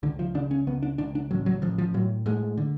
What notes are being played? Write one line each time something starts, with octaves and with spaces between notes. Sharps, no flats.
C#2 D3
F3
C#3 D4
C#4
C#2 B3
D4
C#2 D4
D4
A1 F#3
F#3
A1 F3
F3
A2 F#3
A2 G#3
D3